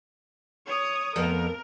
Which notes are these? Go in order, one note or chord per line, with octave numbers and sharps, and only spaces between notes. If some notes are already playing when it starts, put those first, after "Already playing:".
C#5 D#6
F2 A3 B3 A#4